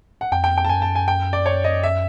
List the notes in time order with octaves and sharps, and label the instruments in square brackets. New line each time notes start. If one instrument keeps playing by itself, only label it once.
[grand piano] F#5
[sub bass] F2 [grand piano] G5
[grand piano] G5
G5
A5
[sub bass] F#2 [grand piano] G#5
[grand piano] A5
G#5
G5
D5
C#5
D#5
E5